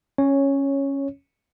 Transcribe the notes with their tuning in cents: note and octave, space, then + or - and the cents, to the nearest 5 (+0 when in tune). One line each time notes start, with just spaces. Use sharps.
C#4 -10 C#5 +0